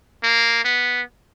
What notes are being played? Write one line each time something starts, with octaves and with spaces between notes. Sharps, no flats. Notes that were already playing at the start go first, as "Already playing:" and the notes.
A#3
B3